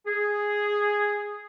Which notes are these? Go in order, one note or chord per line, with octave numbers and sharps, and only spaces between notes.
G#4